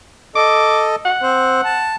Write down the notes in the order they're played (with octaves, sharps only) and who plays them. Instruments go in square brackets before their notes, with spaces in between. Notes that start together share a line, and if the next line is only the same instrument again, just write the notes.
[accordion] A4 D#5 [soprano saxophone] D6
[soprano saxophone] F#5
[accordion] C4 C5
A5